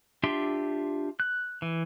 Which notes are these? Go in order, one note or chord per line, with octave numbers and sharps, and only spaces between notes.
D4 F4 G4 E5 C6
F#6
E3